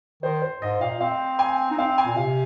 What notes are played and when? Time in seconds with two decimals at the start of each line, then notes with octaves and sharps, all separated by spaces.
0.23 D#3 C5
0.42 C5
0.61 G#2 D#5
0.81 A#2 F5
1.01 C4 F5
1.39 G#5
1.71 D#4
1.78 C4 F5
1.98 G#5
2.06 A#2
2.17 C3 F5